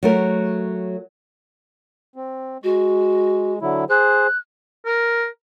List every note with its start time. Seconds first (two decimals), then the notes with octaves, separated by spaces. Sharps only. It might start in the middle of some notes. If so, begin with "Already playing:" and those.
0.03 F#3 A3 A#4
2.16 C4
2.64 G#3 F#4
3.62 D3 F#3 E4
3.90 G#4 C5 F#6
4.85 A#4